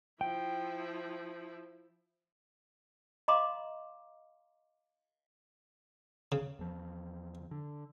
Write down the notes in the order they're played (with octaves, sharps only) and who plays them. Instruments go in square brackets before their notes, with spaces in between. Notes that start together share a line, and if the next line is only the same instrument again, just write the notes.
[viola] F3 E4 [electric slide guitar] G5
[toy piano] D#5 F5 A#5 C6 D6
[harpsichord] C#3
[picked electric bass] E2 F3
D3